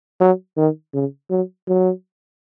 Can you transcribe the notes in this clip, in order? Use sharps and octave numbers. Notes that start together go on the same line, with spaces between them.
F#3
D#3
C#3
F#3
F#3